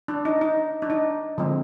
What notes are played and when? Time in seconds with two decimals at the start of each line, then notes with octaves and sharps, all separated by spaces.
0.08 D4
0.25 D#4
0.41 D#4
0.82 D4
0.90 D#4
1.38 D3 F3 G#3 C4